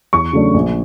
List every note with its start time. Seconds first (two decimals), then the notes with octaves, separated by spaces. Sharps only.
0.13 E2 C#6
0.33 C#3 F#3 A3 D4
0.54 A#1